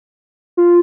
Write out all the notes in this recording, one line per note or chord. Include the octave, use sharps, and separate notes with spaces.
F4